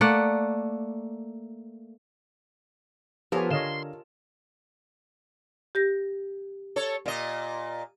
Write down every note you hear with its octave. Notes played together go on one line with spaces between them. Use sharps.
A3 A#3 D5 F#5
F3 B3 F4 G4 A4 A#4 C#5 G#5
D3 C#5 D#5 F5 C6 E7
G4 G6 A#6
A4 C#5
A#2 D#5